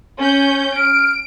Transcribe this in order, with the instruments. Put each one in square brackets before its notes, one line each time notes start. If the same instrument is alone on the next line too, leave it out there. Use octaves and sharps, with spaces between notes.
[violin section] C#4 G6
[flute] F6 [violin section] D7